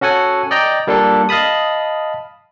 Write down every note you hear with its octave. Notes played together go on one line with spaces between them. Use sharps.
C#4 F#4 A4 F#5 G#5
D5 D#5 G5 A#5
G3 A#3 D4 F4 A4
D#5 F5 A5 B5 D#6